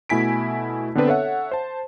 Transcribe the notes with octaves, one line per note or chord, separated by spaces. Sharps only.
B2 A3 E4 G#5 B6 D7
D3 B3 C4 D4 B4
A4 C#5 E5 F#5
C5 A5